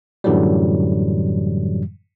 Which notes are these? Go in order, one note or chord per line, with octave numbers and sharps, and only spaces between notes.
F#2 A2 D3 E3 F#3 G3